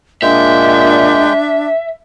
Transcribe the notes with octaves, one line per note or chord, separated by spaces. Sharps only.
A#2 G#3 D4 E5 G5